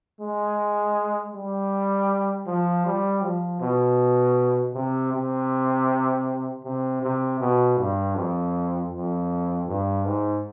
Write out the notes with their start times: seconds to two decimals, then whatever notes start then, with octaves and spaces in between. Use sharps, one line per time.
0.20 G#3
1.34 G3
2.47 F3
2.86 G3
3.22 F3
3.60 B2
4.74 C3
5.12 C3
6.64 C3
7.03 C3
7.40 B2
7.78 G2
8.15 F2
8.92 F2
9.68 G2
10.05 G#2